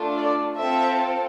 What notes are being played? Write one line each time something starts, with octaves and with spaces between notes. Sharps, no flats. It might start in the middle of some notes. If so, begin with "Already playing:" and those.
Already playing: A3 D4 F4 A4
D5
C4 F4 A4 E5